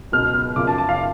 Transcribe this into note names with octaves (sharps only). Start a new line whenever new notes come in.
C#2 B2 F#3 F6
F6
F#2 C#3 F3 D6
A5
A5
F5